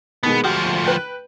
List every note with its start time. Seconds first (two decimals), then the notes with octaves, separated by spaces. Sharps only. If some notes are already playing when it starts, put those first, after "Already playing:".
0.23 B2 D#3 G#3 B3
0.44 D2 F3 F#4 G4
0.86 B4 G5